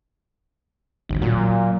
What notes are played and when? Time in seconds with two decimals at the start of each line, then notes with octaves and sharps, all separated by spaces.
1.09 G#1 D#2
1.22 A#2 F#3